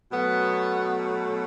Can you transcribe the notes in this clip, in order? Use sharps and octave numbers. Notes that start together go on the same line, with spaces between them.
B2 F#3 A3 B3